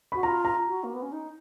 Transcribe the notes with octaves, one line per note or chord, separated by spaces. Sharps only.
F#4 B5
F4 A#5
A#5
F#4
A#3
B3
C#4
D#4